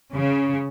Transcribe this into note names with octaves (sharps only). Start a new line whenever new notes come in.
C#3